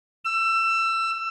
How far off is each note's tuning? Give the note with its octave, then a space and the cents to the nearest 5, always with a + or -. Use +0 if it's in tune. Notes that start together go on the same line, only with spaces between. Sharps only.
E6 +25